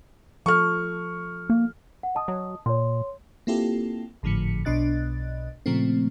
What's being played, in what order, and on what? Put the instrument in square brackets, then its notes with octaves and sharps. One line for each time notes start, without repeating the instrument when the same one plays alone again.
[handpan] F3 A4 [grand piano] C#6 F6
[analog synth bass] A#3
[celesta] F#5
D#5 A5 D#6
[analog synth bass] F#3
[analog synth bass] A#2 [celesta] C#5 C6
[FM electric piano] A#3 C4 E4 F4 G4 A4
G#1 A2 D3 F3 B6 C#7
B1 B2 D4 D#5 F#6 A6
A#2 C#3 F3 A3 C4